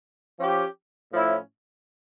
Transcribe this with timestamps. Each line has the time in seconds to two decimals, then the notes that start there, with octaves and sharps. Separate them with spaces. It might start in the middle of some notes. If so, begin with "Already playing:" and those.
0.39 F3 C#4 G4
1.12 A2 F3 C#4 E4